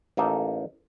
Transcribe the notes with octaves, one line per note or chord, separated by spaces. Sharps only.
A1 A#3 D#4 A4